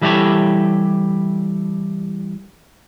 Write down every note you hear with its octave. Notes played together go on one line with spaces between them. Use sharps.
E3 G3 E4 G4 A4 C#5